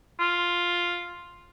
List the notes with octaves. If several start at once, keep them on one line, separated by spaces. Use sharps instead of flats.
F4